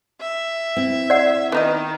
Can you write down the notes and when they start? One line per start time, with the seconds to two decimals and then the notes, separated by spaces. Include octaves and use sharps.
0.21 E5
0.77 C4 E4
1.10 D5 F#5
1.52 D#3 B3 D#4 D#5